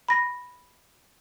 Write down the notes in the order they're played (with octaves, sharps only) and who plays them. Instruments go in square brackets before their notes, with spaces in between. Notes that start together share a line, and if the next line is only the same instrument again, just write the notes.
[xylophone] B5 A#6